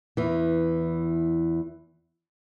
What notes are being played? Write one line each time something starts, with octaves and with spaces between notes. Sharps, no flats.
E2 E3